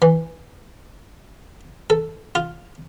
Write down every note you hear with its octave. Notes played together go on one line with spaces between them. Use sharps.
E3
A4
F4